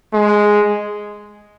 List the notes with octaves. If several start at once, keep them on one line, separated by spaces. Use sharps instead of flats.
G#3